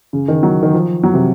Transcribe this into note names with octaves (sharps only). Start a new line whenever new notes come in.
C#3
D#3
F#3
D#3
F3
F#3
C3